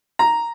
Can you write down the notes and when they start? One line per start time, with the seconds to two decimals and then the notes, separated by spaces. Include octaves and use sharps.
0.19 A#5